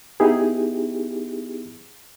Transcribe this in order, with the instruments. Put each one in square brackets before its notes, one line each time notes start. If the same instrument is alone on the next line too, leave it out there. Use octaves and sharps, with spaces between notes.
[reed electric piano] B3 D#4 E4 G4 G#4